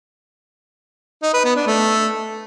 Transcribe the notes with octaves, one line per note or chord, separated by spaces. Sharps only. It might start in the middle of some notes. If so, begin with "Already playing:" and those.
D#4
B4
B3
D4
A3